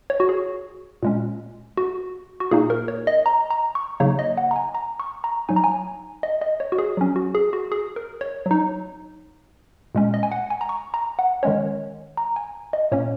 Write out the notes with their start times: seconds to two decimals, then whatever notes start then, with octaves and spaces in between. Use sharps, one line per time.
0.10 C#5
0.20 F#4
0.29 G#4
1.03 A#2 G#3 C#4
1.77 F#4
2.40 F#4
2.51 A#2 A#3 D#4 G#4
2.70 A#4
2.88 C#5
3.07 D#5
3.26 A#5
3.50 A#5
3.75 C#6
4.00 C#3 F#3 A#3 D#4 C#5
4.19 D#5
4.37 F#5
4.51 A#5
4.56 G#5
4.75 A#5
5.00 C#6
5.24 A#5
5.49 F#3 D#4 G#5
5.56 A#5
5.64 G#5
6.23 D#5
6.41 D#5
6.60 C#5
6.72 F#4
6.78 G#4
6.97 F#3 C#4
7.16 F#4
7.35 G#4
7.53 F#4
7.72 G#4
7.96 A#4
8.21 C#5
8.46 F#3 D#4
9.95 A#2 G#3 C#4
10.14 D#5
10.23 G#5
10.32 F#5
10.50 G#5
10.61 A#5
10.69 C#6
10.94 A#5
11.19 F#5
11.43 D#3 G#3 C#4 C#5
12.17 A#5
12.36 G#5
12.73 D#5
12.92 A#2 A#3 C#4 C#5